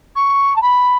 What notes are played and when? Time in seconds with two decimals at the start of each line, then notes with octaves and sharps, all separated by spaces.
0.16 C#6
0.56 A5
0.62 B5